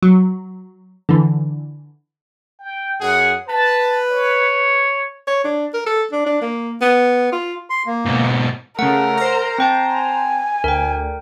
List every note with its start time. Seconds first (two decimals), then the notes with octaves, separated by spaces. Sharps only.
0.03 F#3
1.09 D3 E3
2.59 G5
3.01 F#2 G#4 F#5
3.48 B4 A5
4.11 C#5
5.27 C#5
5.44 D4
5.74 A#4
5.86 A4
6.12 D4
6.26 D4
6.41 A#3
6.81 B3
7.32 F4
7.70 C6
7.87 A#3
8.05 G#2 B2
8.79 C#3 A3 A#4 F#5
9.17 C5 A#5
9.58 C4 G5 A5
9.95 G#5
10.64 D2 A#4 G5